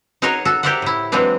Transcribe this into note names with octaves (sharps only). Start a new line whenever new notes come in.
D#4 F#4 G#4 A#4 C#5 D#5
F#4 A4
G4 A#4 C5 D5 E5 F#5
A2 E4
E3 F#3 G#3 C4 D4